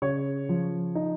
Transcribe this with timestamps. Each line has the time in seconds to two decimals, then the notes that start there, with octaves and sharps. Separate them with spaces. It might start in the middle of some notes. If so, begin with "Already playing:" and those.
0.02 C#3 C#5
0.49 F3
0.95 D#4